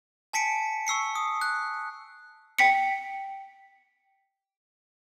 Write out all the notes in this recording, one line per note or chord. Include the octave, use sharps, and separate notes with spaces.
G#5 A5 B6 C#7 D7
C#6 E6 C7 C#7
D#6
F#6
G5 B6 C#7